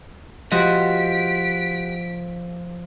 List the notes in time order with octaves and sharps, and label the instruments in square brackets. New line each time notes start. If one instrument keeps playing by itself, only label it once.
[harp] F3 [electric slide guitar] F#4 G4 D#5 [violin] B6 D7